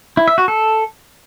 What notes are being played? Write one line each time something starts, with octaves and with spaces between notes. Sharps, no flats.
E4
E5
F#4
A4